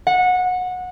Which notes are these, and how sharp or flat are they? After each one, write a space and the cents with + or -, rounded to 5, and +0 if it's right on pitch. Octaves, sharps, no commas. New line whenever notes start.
F#5 -20